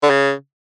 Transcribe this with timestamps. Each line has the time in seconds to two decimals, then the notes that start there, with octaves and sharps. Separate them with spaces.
0.03 D3
0.10 C#3